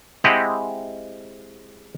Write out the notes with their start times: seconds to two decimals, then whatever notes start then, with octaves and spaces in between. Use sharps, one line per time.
0.24 G#3 C4 E4 G4 D#5 F#5